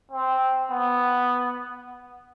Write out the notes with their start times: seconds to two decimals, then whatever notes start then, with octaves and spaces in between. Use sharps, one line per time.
0.11 C4
0.71 B3